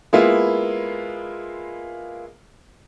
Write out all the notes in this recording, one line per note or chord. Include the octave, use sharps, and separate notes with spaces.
G#3 A#3 B3 E4 F4